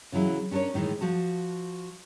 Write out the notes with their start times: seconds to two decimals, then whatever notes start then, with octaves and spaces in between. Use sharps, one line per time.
0.12 C#3 E3 F#3 E4 G#4
0.51 C#4 D4 A4 A#4 C#5
0.74 A2 D#3 E3 G#3
1.01 F3 F#4 A5